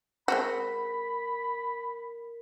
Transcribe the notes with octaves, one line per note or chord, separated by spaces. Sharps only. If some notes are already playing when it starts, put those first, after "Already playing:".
G#3 C4 F#4 A#4 B5